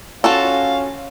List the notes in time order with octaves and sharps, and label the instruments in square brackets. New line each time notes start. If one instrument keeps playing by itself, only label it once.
[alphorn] C#4 [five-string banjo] F4 F#4 A4 [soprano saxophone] F5